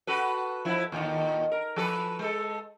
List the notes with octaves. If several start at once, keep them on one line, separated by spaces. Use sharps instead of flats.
F#4 A4 B4
F3 E4
D#2 A#2 D#3
A#4
F3 A4 B4
G#3 A4